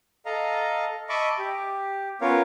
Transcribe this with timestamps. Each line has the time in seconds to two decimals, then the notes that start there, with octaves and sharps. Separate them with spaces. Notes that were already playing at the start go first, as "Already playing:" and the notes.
0.26 A4 D#5 F5 A#5
1.09 D#5 E5 A5 B5 C#6 D6
1.38 G4
2.21 B3 C#4 F4 A#4 C#5 F5